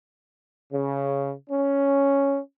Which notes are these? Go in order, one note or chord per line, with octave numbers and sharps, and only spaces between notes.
C#3
C#4